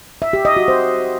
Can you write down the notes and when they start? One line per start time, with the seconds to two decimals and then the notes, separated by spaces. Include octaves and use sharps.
0.22 E5
0.33 G4
0.45 D#5
0.57 F#4
0.68 C5